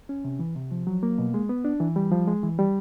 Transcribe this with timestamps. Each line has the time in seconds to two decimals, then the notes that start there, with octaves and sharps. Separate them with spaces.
0.09 C#4
0.24 C3
0.39 E3
0.56 C3
0.71 F3
0.87 F#3
1.03 A#3
1.18 B2
1.34 G#3
1.49 B3
1.65 D4
1.80 E3
1.96 G3
2.12 F3
2.27 G#3
2.43 E3
2.59 G3